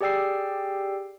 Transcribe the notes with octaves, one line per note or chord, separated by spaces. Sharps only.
G4 G#4 D5 G5 E6 C7